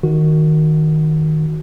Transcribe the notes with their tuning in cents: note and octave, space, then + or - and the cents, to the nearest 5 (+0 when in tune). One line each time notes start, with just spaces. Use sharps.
D#3 +0 F#4 +0